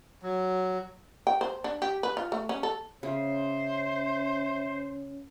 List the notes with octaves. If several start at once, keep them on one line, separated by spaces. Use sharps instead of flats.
F#3
G5
C5
D4
G4
B4
F4
A3
C#4
A4
C#3 C#4 C5 E5